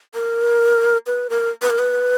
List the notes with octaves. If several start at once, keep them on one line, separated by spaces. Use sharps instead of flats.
A#4
B4
A#4
B4
A#4
B4